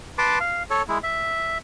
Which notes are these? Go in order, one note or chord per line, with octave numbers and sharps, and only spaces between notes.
B4 A5 C6 D6
F5
A4 C#5
G#3 E4
E5